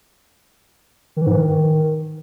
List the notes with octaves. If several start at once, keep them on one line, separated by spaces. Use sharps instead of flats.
D#3
E3
G#2
E3
D#3